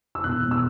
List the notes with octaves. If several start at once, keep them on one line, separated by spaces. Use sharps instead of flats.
E6
E1 F#6
E1
E6